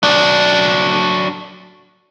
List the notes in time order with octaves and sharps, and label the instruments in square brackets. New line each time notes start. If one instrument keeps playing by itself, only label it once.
[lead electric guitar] F#3 D4